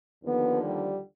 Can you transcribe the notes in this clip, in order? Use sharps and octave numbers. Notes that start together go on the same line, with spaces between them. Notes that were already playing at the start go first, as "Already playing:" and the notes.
D#2 D3 F3 B3
G3